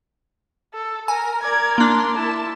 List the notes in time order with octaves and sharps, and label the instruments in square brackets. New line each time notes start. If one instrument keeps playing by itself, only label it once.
[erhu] A4
[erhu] A#4 [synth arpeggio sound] G#5
[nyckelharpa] A#4 D5 [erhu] G#6
[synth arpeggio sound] A#3 D4 [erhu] C6
[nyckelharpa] E4 [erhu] A5